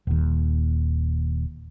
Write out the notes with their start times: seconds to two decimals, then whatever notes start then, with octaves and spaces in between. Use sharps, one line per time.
0.07 D#1 D#2